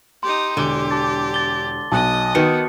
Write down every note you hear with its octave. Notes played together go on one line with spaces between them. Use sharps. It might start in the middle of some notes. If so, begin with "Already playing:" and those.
D#4 G4 C6
E1 D3 G4
A5 D6 A6
A6 G7
B1 D#5 A5 D#6 F#6
D#3 B3 F#4 B4 G5 C#7